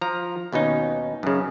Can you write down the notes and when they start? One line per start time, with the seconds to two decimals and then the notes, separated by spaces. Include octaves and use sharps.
0.01 F3 A#5
0.52 D#2 B2 C#4 D#4
1.23 F#2 C#3